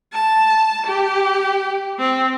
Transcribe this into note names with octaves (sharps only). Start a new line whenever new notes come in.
A5
G4
C4